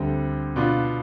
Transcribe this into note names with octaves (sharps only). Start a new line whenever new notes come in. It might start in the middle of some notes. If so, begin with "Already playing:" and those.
Already playing: D2 D3 G3 C4
B2 B3 D4 F4